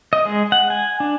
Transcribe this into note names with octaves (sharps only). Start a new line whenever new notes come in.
D#5
G#3
F#5
G#5
D4